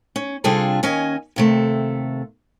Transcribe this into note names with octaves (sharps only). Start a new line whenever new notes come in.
C#4
C3 G3 D4 F4 G#4 A4
D#2 C#4 D#5 G#5
D#2 C3 A3